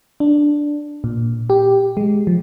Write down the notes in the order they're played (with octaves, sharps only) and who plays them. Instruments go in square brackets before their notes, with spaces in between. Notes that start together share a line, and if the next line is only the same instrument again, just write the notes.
[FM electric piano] D4
A#2
G4
G#3
F3